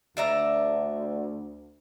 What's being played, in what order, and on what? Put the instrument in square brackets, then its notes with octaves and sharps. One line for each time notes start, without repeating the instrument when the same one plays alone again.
[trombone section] D2 [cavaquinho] D5 E5 A#5